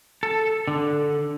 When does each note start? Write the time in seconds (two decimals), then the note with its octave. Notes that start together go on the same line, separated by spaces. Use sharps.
0.23 A4
0.68 D3